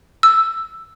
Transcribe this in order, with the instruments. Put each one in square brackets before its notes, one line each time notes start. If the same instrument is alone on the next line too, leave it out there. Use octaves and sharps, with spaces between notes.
[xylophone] E6